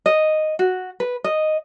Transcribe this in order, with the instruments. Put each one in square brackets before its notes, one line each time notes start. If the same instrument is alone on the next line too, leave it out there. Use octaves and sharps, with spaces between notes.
[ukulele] D#5
F#4
B4
D#5